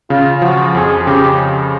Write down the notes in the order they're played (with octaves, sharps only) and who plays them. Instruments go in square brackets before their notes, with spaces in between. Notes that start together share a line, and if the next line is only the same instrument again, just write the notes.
[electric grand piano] C#3 [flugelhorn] F4
[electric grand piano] F3 [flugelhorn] F#4
[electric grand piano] F2 [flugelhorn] G#4
[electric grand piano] C#3 [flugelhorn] G4